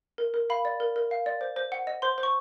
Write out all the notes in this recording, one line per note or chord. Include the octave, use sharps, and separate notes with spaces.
A#4
A#4
F5 B5
D5
A#4
A#4
F5
D5
C5
C5
F#5
D#5
C5 C6
C5
C#6